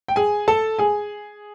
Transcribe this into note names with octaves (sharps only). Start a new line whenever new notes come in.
G5
G#4 G#5
A4 A5
G#4 G#5